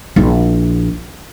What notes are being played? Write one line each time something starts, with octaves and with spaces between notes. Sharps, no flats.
A#1 E4